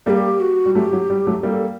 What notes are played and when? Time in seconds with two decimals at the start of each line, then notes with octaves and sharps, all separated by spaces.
0.06 G3 A#3 G4 A4
0.40 F#4
0.66 G3
0.75 F#3 A3 G4
0.92 F#3
1.10 G3
1.27 F#3 A3
1.43 G3 A#3 A4 A#4